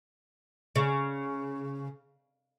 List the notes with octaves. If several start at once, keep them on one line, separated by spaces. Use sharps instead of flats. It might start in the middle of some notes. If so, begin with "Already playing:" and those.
C#3